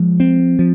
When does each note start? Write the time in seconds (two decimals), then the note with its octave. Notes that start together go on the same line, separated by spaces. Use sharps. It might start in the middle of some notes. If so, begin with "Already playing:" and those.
Already playing: F3 G#3
0.20 C4
0.59 F3